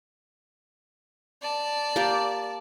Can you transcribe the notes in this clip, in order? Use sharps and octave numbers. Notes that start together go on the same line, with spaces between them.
D5 A5
A#3 G4